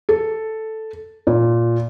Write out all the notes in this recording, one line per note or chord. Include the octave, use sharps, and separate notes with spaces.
A4
A#2